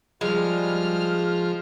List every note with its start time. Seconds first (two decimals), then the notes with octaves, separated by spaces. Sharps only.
0.21 F3 G3 G#3 F6